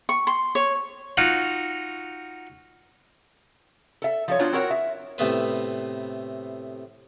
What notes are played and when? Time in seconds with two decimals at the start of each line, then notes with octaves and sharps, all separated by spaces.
0.09 C#6
0.27 C6
0.55 C#5
1.17 D#4 F4 F#4
4.02 A4 E5
4.28 F3 A4 C#5
4.39 B3 D4 F4 F#4 C5 C#5
4.53 C4 E4 F#4 A#4 C#5 F#5
4.71 E5
5.18 A2 C3 A3 B3 B4